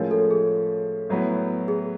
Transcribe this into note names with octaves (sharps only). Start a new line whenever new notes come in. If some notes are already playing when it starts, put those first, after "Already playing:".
Already playing: A2 F3 G#3 C#4 F4 A#4
A4
G#4
A2 F#3 B3 E4
G#4